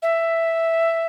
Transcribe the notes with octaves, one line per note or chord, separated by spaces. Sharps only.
E5